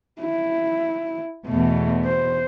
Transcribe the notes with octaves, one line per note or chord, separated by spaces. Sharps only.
E4
E2 B2 A3
C5